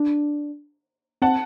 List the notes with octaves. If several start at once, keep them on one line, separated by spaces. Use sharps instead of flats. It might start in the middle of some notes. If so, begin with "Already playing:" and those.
Already playing: D4
C4 F#5 A5